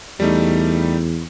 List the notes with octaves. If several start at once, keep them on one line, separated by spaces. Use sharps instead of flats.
E2 G3 A3 D#4